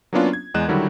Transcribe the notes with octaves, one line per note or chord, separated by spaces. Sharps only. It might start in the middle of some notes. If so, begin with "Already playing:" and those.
F#3 A#3 B3 C#4 D4 F4
G#6
E2 G#3 D#5 F#6 E7
D3 D#3 F#3 G3 E4 F#4